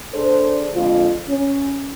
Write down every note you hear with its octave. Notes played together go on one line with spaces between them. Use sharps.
D4 G#4 A4 C5
F2 D3 G#3 F4
C#4